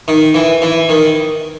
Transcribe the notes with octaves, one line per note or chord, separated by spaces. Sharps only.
D#3
E3
E3
D#3